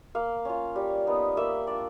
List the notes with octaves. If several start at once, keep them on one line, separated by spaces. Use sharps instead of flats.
A#3 F5
C#4 F4
G3
B3 D#4
A#3 E5
D4 F4 D5